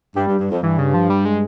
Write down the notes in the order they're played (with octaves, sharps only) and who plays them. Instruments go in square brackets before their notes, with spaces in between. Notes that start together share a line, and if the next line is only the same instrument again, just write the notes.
[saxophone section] G2 [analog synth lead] G3
[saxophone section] G2
G2
F2
[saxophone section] G2 [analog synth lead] E3
[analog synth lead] C#3
F3
G3
G#3